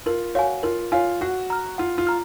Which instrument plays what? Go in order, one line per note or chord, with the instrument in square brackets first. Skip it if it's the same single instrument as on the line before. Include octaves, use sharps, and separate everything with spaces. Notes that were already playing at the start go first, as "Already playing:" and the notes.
[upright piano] F4 [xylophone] A#4
[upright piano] F#4 [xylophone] C#5 F5 G#5
[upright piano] F4 [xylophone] A#4
[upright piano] F4 [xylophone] C#5 F5 G#5
[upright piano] F#4 [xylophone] F#5
[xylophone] A#5 F6
[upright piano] F4 [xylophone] F#5
[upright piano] F4
[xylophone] A#5 F6